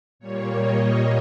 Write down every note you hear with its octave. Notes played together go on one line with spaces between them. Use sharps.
A#2 G3 A#3 C#5
D#5